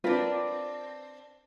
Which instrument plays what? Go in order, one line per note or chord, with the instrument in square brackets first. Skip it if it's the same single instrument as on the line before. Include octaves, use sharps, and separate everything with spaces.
[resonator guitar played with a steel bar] C4 D4 [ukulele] F4 A#4 B4